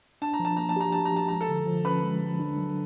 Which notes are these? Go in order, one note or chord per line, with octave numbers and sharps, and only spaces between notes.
D4 A5
A#5
F3
A5
A#3 A#5
A5
G4 A#5
D4 A5
A#5
F3 A5
G#3 A#5
A4 A5
D3
F3
C#4 B4 B5
G#3
D3
D4
F#3